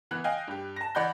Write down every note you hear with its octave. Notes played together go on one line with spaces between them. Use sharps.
E3 B3 F#6
D#5 F5 G5 G#5
G2 G4
A5 A#6
E3 D5 F#5 B5 G6